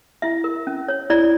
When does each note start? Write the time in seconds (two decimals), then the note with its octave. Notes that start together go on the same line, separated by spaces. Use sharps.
0.22 E4 E5
0.44 A#4
0.67 C#4
0.88 C#5
1.10 E4 D5